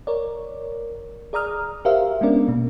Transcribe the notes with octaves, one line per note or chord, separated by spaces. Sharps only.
A#4 C#5 D5
G#4 D5 A#5 D#6 F6
F#4 G4 A#4 C5 E5 F5
G#3 B3 C#4 D4 A#4 D5
B2 A#3